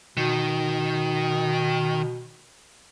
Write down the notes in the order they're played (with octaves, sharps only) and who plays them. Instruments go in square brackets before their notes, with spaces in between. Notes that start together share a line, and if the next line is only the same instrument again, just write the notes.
[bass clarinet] B2 [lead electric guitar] D#3